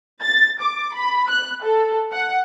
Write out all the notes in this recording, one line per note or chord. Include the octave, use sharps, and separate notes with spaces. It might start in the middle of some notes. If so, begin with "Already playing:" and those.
A6
D6
B5
F#6
A4
F#5